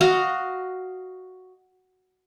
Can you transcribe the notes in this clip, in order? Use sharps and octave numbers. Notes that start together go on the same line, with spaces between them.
F#4 D#5 F5 F#5